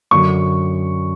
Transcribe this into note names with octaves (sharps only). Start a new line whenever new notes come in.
F#2 D3 F#3 C#6